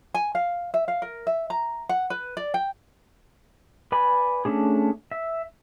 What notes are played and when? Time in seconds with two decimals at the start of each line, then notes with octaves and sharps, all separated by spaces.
0.14 G#5
0.35 F5
0.74 E5
0.88 F5
1.02 A#4
1.27 E5
1.50 A#5
1.89 F#5
2.10 B4
2.37 D5
2.54 G5
3.92 B4 D5 G#5 B5
4.45 A3 C#4 D4 G#4
5.11 E5